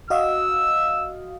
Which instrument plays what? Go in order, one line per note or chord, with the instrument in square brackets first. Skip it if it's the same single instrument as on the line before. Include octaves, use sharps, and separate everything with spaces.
[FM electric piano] F#4 D#5 F5 [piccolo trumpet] E6